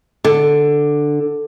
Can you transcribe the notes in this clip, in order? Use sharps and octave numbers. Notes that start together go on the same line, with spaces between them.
D3